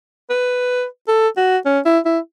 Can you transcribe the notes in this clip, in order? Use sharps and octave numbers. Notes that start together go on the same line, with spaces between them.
B4
A4
F#4
C#4
E4
E4